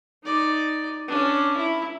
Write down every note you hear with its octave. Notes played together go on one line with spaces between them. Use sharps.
D#4 D5
C#4 D4
E4